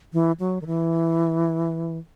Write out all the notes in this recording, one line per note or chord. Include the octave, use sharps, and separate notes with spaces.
E3
F#3
D#3
E3